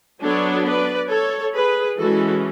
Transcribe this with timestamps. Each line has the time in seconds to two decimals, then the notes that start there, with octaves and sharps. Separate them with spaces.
0.21 F#3 B3 D4 A4 C#5
0.66 B4 D5
1.10 A4 C#5
1.54 G#4 B4
1.98 E3 G#3 C#4 F#4 A4